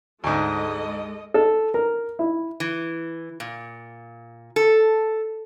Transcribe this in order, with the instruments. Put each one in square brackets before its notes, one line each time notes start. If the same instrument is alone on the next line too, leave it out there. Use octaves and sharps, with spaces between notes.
[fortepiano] D2 G#2 [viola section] G#3 A4 D#5
[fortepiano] A4
A#4
E4
[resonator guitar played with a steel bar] E3
A#2
A4